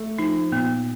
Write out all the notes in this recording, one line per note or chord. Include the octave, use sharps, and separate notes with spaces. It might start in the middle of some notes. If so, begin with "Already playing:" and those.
Already playing: A3
F3 D#4
A#2 B3